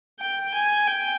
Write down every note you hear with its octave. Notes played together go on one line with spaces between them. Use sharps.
G5
G#5
G5